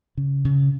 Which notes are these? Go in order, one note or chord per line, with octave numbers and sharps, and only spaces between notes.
C#3
C#3